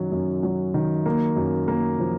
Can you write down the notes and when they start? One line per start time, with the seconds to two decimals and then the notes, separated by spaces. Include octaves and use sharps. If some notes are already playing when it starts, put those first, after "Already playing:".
Already playing: F#2 D#3 F#3
0.12 F#2
0.43 F#3
0.74 D#3
1.06 A#3
1.36 F#2
1.68 A#3
1.99 F3